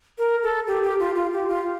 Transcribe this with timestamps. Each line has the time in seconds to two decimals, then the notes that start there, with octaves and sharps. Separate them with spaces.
0.19 A#4
0.43 A4
0.67 G4
0.83 G4
0.99 F4
1.15 F4
1.33 G4
1.49 F4